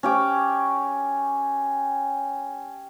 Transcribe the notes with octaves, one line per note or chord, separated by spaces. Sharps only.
C#4 G4 D6